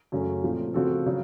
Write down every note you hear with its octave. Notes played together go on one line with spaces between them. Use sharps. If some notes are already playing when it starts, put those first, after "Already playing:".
F#2 C#3 A3 C#4
A#2 F3 A3 C4
C#3 F3 C4 F#4 A4
C#3 F#3